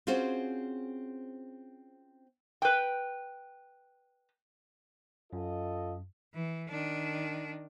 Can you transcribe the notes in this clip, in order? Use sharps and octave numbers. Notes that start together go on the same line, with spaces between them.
C4 C#4 F4 F#4 G#4 C5
B4 G5
F#2 F4 A4 D#5
E3
D#3 D4